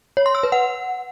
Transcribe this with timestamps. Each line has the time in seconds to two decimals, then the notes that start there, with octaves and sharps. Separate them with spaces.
0.17 C#5
0.26 C6
0.35 E6
0.43 B4
0.52 F#5